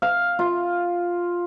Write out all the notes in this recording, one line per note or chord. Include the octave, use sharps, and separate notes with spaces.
F5
F4